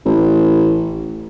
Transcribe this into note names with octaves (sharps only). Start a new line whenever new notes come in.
A1